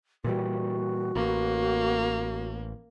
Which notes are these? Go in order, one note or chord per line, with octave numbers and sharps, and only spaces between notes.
A#2 E3 G3 F#4
A1 A#3